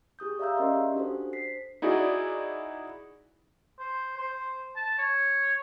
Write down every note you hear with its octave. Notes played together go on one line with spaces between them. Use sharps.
G4 G#4 D#6 G6
D5 E5 F5 A#5 E6 G6
C#4 A#4 D#5 C6
G4
D4 F#4 A4 C5
B6 C7
D#4 E4 F#4 G#4 D5
C5
C5
A5
C#5